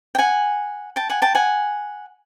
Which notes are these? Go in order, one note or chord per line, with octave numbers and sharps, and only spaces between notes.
G5
F#5 G#5
G5 A5
F#5 G#5
G5 A5
F#5 G#5